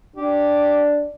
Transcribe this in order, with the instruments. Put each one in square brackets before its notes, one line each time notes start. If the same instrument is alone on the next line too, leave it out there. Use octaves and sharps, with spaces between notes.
[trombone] D4 [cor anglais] G4